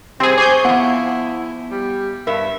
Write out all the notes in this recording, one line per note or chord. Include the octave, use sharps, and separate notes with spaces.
C3 G3 C4 G#4
G#4 C5 G#5 C#6 D6 G6
F3 B3 E4 F#5
G3
G2 A#4 E5